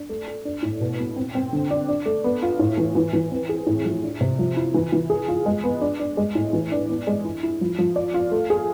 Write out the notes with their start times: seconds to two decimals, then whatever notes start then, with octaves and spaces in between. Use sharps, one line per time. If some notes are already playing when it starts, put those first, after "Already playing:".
Already playing: D4
0.09 A3
0.28 A4
0.45 D4
0.63 A2
0.80 B2
0.99 B3
1.16 C4
1.35 C4
1.53 D3
1.71 D4
1.89 D4
2.06 A3
2.24 B3
2.42 F4
2.59 A2
2.78 E3
2.95 E3
3.13 E3
3.32 C4
3.49 G#4
3.67 A2
3.85 F3
4.03 D4
4.21 C3
4.39 F3
4.57 E4
4.74 E3
4.92 E3
5.10 G#4
5.28 F4
5.46 G#3
5.64 B3
5.81 D4
6.00 D4
6.17 G#3
6.35 A2
6.53 E3
6.72 D4
6.89 B3
7.07 G#3
7.25 E4
7.43 E4
7.61 F3
7.79 F3
7.96 D5
8.14 F4
8.32 A3
8.50 G#4